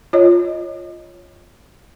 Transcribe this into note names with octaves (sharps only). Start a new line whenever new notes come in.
F4 C#5 D#5